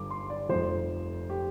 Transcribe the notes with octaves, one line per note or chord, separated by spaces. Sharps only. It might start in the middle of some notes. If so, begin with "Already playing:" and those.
Already playing: G1 D6
C6
D5
F1 F2 F3 C5
G4